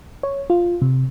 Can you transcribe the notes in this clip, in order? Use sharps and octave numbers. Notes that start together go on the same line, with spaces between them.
C#5
F4
C3